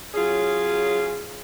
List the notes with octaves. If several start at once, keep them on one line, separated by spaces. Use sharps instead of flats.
F#3 C#4 F4 G#4